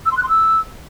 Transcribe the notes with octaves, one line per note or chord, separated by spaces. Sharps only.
E6
C6
F#6
C6
E6